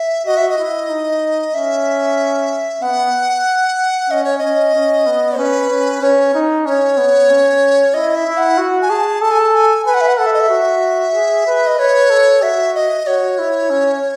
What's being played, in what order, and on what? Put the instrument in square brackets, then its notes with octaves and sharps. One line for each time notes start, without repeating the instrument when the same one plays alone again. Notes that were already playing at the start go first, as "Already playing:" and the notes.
Already playing: [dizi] E5
[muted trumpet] F#4 [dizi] D#5
[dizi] E5
D#5
[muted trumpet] E4
D#4
[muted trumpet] C#4 [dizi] E5
[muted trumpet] B3 [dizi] F#5
[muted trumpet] C#4 [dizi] D#5
[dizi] C#5
D#5
[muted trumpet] C#4
C#4
B3
[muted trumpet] C#4 [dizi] B4
[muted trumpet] C#4
[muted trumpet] C#4 [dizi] C#5
[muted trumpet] D#4
[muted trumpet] C#4 [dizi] C#5
[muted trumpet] B3
C#4
[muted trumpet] E4 [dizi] D#5
[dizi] E5
[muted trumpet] E4
[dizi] F#5
[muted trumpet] F#4
[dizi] G#5
[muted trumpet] G#4 [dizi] A5
[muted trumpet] A4 [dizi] A5
[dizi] G#5
A5
G#5
[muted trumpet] B4 [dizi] G#5
[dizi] F#5
E5
F#5
[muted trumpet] A4 [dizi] F#5
[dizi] E5
D#5
E5
[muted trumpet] F#4
G#4
B4
[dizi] D#5
[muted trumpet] B4 [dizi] C#5
[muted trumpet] A4
[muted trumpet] F#4 [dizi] E5
[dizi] D#5
[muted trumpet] F#4 [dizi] C#5
[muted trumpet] E4
C#4